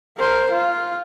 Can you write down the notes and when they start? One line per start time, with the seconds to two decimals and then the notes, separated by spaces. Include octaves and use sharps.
0.18 A#4 C5
0.51 F4